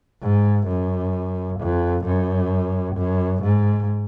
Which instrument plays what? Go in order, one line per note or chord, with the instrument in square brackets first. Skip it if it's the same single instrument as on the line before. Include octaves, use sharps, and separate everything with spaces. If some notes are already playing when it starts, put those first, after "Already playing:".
[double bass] G#2
F#2
F2
F#2
F#2
G#2